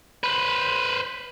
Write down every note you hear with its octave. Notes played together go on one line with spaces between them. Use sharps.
B4 C5